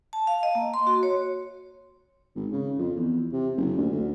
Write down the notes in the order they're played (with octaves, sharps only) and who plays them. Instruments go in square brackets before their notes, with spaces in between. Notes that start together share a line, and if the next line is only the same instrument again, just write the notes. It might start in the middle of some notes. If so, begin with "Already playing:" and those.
[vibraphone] A5
F5
D#5
A#3
C6
F#4
C#5
[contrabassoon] G#1
C#3
F2
E2
C3
F#1
D2
D2